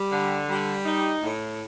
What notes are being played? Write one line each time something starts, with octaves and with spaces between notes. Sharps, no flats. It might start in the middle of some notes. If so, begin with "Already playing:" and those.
Already playing: G3
D3
G3
D#4
A2